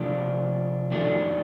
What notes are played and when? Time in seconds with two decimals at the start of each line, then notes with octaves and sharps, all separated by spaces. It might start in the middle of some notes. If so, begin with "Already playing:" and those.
Already playing: C3 F3 A3 D4 F4
0.91 F2 D#3 A3 D4